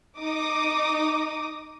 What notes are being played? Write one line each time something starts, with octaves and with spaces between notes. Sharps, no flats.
D#4 D6 D#6